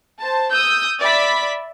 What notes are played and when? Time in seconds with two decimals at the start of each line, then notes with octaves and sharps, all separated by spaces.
0.20 C5 A5
0.52 D#6 E6 G6
1.00 D5 E5 B5 B6